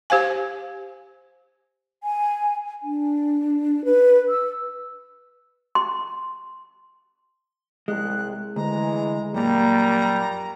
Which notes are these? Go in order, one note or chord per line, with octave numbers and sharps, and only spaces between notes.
G4 C5 F5 G#5
G#5
D4
B4
E6
C6
C2 G#3 F#6
D2 E3 G#3 A#5
F#2 A#2 G3 A#3 A#5